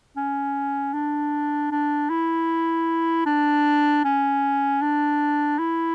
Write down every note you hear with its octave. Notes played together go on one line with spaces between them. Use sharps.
C#4
D4
D4
E4
D4
C#4
D4
E4